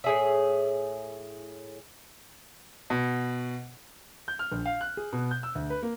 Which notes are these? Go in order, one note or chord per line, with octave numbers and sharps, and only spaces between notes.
A2 G#4 E5
B2
G6
F6
A#1
F5
F#6
G#4
B2
G6
E6
D2
B4
A#3